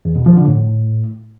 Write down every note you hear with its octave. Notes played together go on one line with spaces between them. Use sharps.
E2
B2
F3
D3
A2